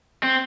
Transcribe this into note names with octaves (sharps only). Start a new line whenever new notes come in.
C4